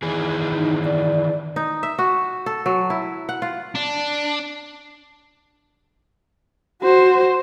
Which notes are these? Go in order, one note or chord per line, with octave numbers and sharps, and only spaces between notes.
D#3 E3 G#4
D#4
D5
D#4
E5
F#4
A4
F#3
E4
F#5
F4
D4
F#4 C5